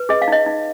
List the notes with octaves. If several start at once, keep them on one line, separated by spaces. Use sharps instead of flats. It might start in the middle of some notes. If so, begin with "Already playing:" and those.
Already playing: B4
G#4 D#5
F5
D#4 D#5
D#4